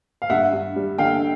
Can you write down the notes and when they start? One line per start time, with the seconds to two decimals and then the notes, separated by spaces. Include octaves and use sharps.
0.22 F5
0.30 G2 E5 F#5
0.53 G2
0.76 G3
0.98 D3 F5 G5